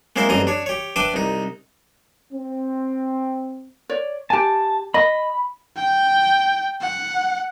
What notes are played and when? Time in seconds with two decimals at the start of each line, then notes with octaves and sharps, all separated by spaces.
0.16 G#3 A#3 C4 E4 C5
0.29 A1 G2 C4 D#5 A#5
0.47 D4 C#5
0.66 G4 C#5
0.96 D4 B4 D5 E5 G5
1.14 C2 D#4
2.33 C4
3.90 C#5 D5
4.30 G4 G#5 A5
4.94 D#5 B5
5.76 G5
6.81 F#5